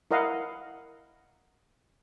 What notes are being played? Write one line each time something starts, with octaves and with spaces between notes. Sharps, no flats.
E4 A#4 D#5 F5 F#5